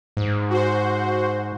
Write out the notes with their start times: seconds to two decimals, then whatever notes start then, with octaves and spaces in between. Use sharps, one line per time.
0.17 G#2
0.50 F#4 C5